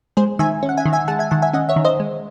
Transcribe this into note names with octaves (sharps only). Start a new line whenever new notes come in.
G#3 G#4 C5
D#3 E5 G#5
C#4
F#5
E5 G#5
D#3
E5 G#5
G#3 F#5 A5
E5 G#5
D#3 F#5 A5
E5 G#5
C#4 D#5 F#5
C#5 E5
D#3
C5 D#5
G#3